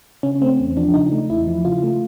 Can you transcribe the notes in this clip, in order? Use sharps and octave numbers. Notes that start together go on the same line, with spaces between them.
C#3 C#4
A3 C4
E2
F3 D4
C#3 D#4
A3
E2 E4
F3
C#3 F4
A3